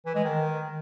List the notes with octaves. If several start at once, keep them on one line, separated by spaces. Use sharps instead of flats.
E3
G#3
D#3